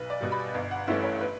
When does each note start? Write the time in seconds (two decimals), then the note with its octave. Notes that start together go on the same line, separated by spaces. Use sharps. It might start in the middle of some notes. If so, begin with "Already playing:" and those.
Already playing: B1 B4
0.10 D5
0.20 B2 G3
0.32 B5
0.54 G1
0.71 F#5
0.87 G2 E3 A3 C#4 E5
1.04 C#5
1.21 B4